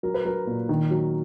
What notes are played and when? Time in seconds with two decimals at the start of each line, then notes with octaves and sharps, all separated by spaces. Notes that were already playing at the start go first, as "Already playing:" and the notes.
0.03 F#3 A#4
0.14 B4
0.25 F#3 A#4
0.47 A#2
0.69 D#3
0.91 F#3